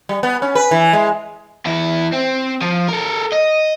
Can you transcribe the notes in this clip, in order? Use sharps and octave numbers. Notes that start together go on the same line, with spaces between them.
G3
B3
C#4
B4
E3
G#3
E2 E4
C4
F3
A4 A#4
D#5